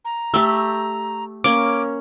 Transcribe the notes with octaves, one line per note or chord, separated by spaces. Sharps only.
A#5
A3 G4 E6
A#3 C#4 D6